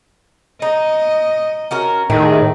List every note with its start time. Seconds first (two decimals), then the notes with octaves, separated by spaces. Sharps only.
0.62 D#4 D#5
1.71 C#4 F#4 A#4
2.10 A2 D#3 G4 G#4